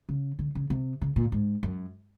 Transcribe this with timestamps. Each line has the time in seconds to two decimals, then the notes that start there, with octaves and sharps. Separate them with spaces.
0.09 C#3
0.39 D3
0.55 C#3
0.70 C3
1.01 C#3
1.16 A#2
1.32 G#2
1.63 F#2